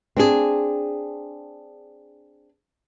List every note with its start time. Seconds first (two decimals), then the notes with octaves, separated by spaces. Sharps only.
0.17 C4 D4 G#4